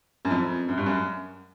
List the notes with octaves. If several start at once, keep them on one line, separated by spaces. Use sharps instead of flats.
F#2
F2
F#2
G2
F#2